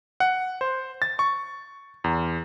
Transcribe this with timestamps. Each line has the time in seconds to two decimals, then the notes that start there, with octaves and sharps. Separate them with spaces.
0.20 F#5
0.61 C5
1.02 A6
1.19 C#6
2.04 E2